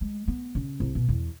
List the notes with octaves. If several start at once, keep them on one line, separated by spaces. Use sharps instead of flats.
G#3
B3
C#3
C2
B2
E2